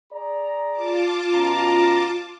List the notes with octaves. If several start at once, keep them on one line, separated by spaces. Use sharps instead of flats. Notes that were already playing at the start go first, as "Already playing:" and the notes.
G#4 D5 A#5
F4 A5 D6
B2 C#4 A#5